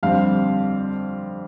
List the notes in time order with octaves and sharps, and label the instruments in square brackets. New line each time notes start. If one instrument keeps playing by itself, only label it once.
[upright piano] F2 D3 G3 C4 F5